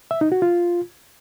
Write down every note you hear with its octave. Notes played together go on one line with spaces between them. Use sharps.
E5
D#4
F#4
F4